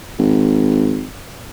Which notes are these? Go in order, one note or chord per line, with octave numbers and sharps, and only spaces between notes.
G#1